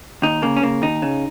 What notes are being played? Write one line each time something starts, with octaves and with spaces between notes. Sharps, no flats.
D#2 D#4
C#3 A#3
C#4
C#3 A#3
D#2 D#4
C#3